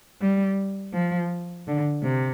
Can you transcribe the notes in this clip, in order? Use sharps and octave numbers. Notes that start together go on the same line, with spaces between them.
G3
F3
D3
C3